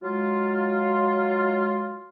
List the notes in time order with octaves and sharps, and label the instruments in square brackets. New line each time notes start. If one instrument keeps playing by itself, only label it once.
[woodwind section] F#3 G#3 F4